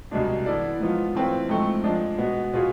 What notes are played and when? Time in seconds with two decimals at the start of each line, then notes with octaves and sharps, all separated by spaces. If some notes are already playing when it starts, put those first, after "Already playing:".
0.11 C2 B2 G#3 D4
0.46 E3 B3 E4 A4 D5
0.80 G#2 F3 B3 F4
1.15 E3 A3 C4 F4 B4
1.49 G#2 F3 A3 C4
1.84 F3 G#3 D4
2.18 B2 G#3 B3
2.53 B2 B3 F4 G#4